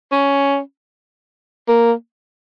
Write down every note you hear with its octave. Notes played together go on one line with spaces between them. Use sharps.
C#4
A#3